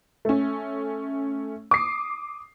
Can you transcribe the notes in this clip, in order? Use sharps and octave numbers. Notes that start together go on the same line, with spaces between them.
A3 C#4
D6 D#6 C7